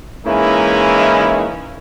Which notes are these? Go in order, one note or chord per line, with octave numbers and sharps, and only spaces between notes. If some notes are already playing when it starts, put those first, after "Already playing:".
E3 G#3 A#3 C#4 D#4 E4